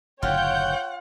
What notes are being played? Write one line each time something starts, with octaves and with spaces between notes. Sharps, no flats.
F#1 A2 D3 F4 C#5 F#5 G5 G6